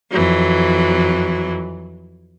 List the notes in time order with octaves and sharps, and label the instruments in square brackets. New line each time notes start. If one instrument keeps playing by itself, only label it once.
[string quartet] F2 E3 F#3